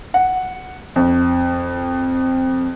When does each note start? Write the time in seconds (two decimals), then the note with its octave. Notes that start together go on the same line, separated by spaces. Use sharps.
0.14 F#5
0.96 F2